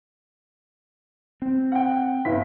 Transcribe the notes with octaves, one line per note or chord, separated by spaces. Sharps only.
C4
F#5 G5
G1 E4 B6